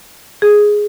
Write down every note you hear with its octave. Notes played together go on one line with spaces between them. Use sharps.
G#4